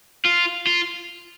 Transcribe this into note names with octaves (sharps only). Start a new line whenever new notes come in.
F4
F4